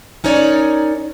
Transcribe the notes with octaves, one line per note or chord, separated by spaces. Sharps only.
C#4 D#4 A#4 C#5 D5